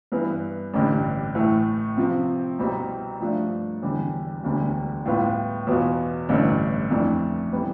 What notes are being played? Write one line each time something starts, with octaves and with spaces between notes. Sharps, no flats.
G2 E3 B3
A1 G2 D3 G3
A2 E3 A3
C3 F3 C4
C2 B2 G3 C4
G2 F3 A3 D4
E1 E2 D3 G3
E1 D2 D3 G3
A2 G3 B3 F4 B4
E2 B2 B3 F4
A1 G2 D3 A3 E4
F2 E3 A3 D4
C3 E3 G3 B3